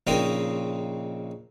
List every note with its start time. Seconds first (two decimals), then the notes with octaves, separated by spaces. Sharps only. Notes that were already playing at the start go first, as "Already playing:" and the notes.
0.07 A#1 C#3 C4 D#4 A#4